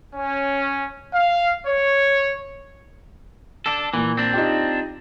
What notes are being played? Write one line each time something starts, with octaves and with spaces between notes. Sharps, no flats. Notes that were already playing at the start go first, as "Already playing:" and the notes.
C#4
F5
C#5
D4 A4
A#2 E3
C4 D4
D#4 F4 G4